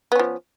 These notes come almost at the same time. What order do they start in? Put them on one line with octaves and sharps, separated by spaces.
B3 C#4 F3